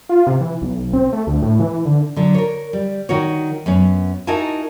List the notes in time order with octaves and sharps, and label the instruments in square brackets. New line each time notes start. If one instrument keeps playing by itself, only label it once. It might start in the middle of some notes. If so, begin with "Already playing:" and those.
[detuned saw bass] F4
C3
E3
B1
C4
A3
D2
A2
E3
D3
[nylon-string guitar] D3 F#3
A#4 C#5
G3
D#3 F#4 C#5
F#2 B3 C#4
D#4 E4 F#4 A#4 G#5 A5